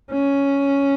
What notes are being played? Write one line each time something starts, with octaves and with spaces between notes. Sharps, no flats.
C#4